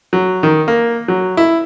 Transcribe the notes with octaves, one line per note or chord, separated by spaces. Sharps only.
F#3
D#3
A#3
F#3
E4